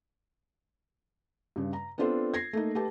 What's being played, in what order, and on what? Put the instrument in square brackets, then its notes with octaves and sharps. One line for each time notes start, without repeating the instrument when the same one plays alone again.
[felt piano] G2 C#3
A#5
B3 C4 D4 F4 A4 C5
G#6 A#6 C7
A3 A#3 D#4
A3 G4 B4 A5